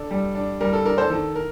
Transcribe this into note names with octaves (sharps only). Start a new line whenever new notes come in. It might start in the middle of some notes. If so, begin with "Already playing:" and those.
Already playing: D4 A4
G3
D4
G3 A#4
A4
D4 A#4
A4 C5
D#3 A4
A#4